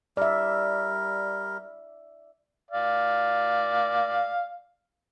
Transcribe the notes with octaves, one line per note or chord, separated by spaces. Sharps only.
G3 A#4 D5 E5
D5 F5